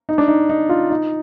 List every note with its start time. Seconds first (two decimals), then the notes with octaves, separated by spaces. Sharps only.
0.09 D#4
0.18 D4
0.28 D#4
0.49 D#4
0.69 F4
0.90 D#4